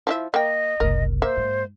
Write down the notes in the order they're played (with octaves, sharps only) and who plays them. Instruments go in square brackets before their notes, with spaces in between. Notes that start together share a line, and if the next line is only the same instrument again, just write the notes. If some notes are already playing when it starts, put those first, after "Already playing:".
[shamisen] F3 E4 E5
[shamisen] A#3 G5 [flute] D#5
[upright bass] F#1 C2 [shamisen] A#4
[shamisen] A#3 E5 [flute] C5
[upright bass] G#2